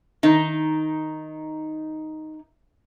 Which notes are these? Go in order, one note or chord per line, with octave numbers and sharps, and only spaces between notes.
D#3 D#4